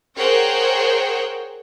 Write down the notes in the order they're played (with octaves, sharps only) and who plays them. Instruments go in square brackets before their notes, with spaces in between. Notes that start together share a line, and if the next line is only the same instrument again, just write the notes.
[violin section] G#4 A#4 C5 C#5 F#5 G5